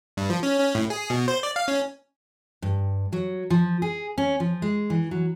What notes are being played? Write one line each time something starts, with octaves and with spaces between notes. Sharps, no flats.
G2
F3
C#4
C#4
A2
G#4
B2
C5
D5
F5
C#4
G2
F#3
F3
G#4
C#4
F3
G#3
E3
F#3